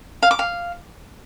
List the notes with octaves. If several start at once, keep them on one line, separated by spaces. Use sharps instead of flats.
F5
D6
F5